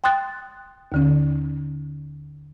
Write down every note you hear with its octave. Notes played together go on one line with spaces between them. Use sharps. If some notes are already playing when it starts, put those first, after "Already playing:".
G5 C6 D#6 F#6 A6
D#2 D3 C#4